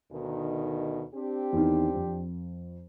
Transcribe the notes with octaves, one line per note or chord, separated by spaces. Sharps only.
D2 B2 D#3
C4 D4 G4
E2 D#3
F2